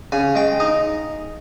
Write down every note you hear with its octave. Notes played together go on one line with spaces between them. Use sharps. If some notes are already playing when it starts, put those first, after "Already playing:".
C#3 G#5
G#3 G5
D#4 D#5